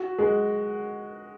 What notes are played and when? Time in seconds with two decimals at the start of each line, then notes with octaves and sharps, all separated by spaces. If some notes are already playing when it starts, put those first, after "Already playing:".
Already playing: F#4
0.19 G#3